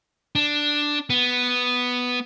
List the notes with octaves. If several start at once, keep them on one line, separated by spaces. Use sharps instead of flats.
D4
B3